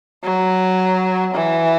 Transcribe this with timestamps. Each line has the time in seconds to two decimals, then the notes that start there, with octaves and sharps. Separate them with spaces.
0.24 F#3
1.34 E3